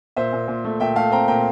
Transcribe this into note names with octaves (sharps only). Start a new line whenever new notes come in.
A#2 C5 E5
A#2
A#2
A3
A#2 E5 G5
A3 F5 A5
C4 G5 A#5
A#2 G5 A#5